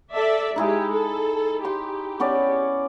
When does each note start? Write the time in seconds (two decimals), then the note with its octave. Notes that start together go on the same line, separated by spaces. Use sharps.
0.13 A4 D5 E5
0.56 G#3 D#4 E4 G4 G#4
0.93 A4
1.65 G4 C6
2.20 B3 C#4 D5